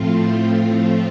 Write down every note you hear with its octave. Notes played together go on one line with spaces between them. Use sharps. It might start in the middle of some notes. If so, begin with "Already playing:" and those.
Already playing: A2 F3 A3 C4 F4